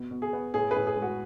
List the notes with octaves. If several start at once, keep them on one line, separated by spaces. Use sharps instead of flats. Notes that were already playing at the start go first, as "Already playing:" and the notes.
Already playing: B2
B2
G#4
B3
A2 G#4
G#4 B4
A2
G#4
G#3
F#4